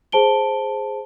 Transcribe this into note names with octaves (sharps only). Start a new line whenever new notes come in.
G#4 C5 A5 D7 G7